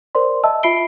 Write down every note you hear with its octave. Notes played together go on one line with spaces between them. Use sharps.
A#4 C5 D5 C6
D#5 E5 A5 E6
F4 E5 B5 C7 D7 G7